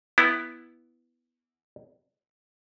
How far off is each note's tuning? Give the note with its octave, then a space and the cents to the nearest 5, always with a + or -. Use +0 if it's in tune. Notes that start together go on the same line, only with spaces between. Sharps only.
B3 +0 E4 +0